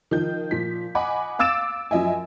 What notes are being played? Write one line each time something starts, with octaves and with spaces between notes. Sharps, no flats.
D#3 F3 G6
A#2 F3 B6
D#5 F#5 G#5 B5 D6
F5 D6 E6 A6 D7 E7
F#2 F3 D#5 E5 G#5